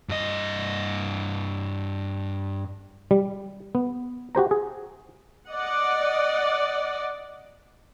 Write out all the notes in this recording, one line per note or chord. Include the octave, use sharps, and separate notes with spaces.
G2 D#5
G3
B3
F#4 G4 C5 A#5
G#4
D5 D#5 F#5